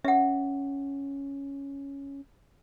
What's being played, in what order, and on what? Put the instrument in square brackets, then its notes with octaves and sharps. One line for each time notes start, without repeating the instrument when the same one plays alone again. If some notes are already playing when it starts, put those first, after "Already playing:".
[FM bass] C#4 [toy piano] E5 F#5